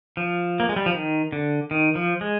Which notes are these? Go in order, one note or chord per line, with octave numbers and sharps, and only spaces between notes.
F3
A#3
G#3
G3
F3
D#3
D3
D#3
F3
G#3